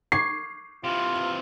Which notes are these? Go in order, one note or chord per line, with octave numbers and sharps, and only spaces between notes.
C#6 D6 G#6 C7
C3 E3 F4